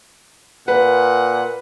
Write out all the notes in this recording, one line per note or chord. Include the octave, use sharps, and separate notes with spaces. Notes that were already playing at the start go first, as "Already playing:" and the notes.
A#2 B4 F#5